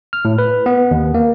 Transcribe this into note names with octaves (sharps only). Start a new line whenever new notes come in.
F6
A2
B4
B3
D#2
A#3